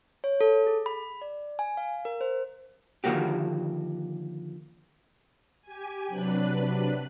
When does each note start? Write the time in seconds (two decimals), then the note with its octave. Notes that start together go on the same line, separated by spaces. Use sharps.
0.24 C#5
0.41 A4
0.67 G#4
0.86 B5
1.21 D5
1.59 G#5
1.77 F5
2.05 A#4
2.21 C5
3.04 D3 D#3 F3 A#3 F#4 G4
5.62 G4 G#5
6.08 C3 F#3 D4 B4 F#6